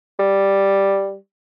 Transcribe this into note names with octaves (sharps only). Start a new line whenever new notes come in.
G3